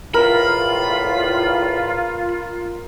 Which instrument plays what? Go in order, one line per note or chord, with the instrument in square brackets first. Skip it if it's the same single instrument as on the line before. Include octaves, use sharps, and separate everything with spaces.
[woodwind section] E2 A2 [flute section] F4 [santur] A#4 [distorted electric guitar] B5